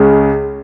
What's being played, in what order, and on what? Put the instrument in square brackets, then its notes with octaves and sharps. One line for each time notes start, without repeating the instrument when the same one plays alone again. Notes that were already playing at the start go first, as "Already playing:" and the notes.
Already playing: [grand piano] C#2 C#3 G#3